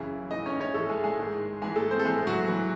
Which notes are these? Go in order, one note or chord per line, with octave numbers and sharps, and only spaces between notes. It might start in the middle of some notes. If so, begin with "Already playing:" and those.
Already playing: F#2 C#3 E3 E4
A2 E3 D#4 D#5
C#4 C#5
C#4 C#5
A2 E3 A3 A4
G#3 G#4
G#3 G#4
G#2 D#3
G#2 E3 G#3 G#4
A3 A4
C4 C5
A4
A2 E3 G#3 G#4
F#3 F#4
E3